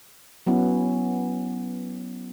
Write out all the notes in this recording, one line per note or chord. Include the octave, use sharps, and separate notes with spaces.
F#3 B3 C#4 E4